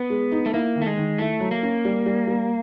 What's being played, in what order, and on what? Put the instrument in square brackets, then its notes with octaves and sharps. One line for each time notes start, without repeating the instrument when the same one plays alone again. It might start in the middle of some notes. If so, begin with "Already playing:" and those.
Already playing: [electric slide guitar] B3
[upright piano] G#3
D#4
[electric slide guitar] A3
[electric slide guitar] A#3 [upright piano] E4
[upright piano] D#3
[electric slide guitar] A3
G#3
[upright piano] D#3
[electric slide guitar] A3 [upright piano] E4
[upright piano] F#3
[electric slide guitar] A#3
[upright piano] C#4
G3
G3
G3